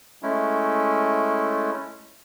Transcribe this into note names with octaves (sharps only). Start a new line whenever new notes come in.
G#3 A3 C#4 E4